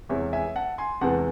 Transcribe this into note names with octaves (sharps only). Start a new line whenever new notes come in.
E2 C3 E3 G#3 C#5 E5
E5 G#5
F#5 A5
G#5 C6
E2 C3 E3 G#3 F#5 A5